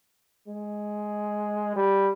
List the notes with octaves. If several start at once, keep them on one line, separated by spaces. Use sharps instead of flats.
G#3
G3